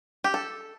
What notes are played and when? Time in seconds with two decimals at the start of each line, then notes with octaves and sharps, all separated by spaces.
0.24 G4
0.34 A4